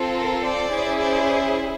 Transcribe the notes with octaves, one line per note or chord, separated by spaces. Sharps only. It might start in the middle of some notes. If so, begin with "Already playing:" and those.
Already playing: C4 F4 A4
A#4
C5 D5
C#4 E4 G#4
C5 D5